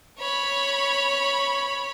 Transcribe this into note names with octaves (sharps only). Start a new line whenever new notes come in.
C#5 B5